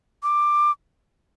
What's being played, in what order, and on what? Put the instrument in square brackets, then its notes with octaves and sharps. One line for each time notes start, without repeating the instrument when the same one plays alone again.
[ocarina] D6